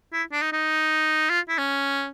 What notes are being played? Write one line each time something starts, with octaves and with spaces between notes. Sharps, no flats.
E4
D4
D#4
D#4
F4
E4
C#4